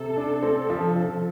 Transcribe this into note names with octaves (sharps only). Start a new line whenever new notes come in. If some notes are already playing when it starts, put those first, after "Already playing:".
Already playing: C3 A4
D4
C4
F3
F3